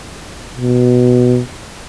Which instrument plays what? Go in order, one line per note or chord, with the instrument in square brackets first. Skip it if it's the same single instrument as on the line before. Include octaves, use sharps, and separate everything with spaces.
[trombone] B2